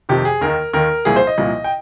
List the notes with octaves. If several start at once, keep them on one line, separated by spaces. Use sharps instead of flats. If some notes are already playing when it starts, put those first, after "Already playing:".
F2 C3 D#3 G4
G#4
D#2 D#3 A#4
D#2 D#3 A#4
C2 A#2 F3 G#4
C5
D#5
C2 A#2 F3
G5